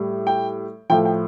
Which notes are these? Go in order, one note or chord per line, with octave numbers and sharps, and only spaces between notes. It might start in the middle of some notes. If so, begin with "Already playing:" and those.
Already playing: A2 G3
G5
A2 F3 G5
G5